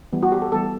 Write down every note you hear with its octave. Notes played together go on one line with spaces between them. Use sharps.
E3 G3 B3
F#4
G4
A4
E3 G3 B3 A4